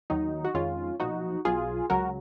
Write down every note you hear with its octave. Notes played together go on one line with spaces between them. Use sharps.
D#2 D#3 F#3 D#4
F#4
F2 D#3 G#3 C#4 F4
B1 A#2 F3 D#4 F#4
B1 B2 F#3 F4 G#4
C#2 C#3 F#3 F#4 A#4